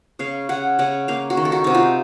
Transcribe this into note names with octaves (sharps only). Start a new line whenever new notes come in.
C#3 F5
C#3 F#5
C#3 F#5
A#3 F5
F#4
D#3
A4
F#4
C3 D#4
F4